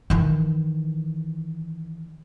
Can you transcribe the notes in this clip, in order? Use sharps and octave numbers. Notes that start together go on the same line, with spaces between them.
D#3 E3